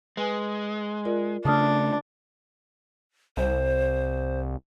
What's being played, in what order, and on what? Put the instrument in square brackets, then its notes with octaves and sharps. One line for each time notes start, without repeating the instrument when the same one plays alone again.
[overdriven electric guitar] G#3 [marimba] B4 G#5
[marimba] F4 A#4 D5
[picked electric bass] C#3 A3 [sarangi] D4 [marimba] A5 D#6 F6
[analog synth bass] C2 [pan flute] C5